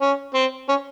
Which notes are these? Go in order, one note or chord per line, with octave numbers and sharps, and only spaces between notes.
C#4
C4
C#4